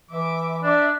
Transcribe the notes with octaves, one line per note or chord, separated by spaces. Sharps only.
E3 E5 D6
D4 D5 E5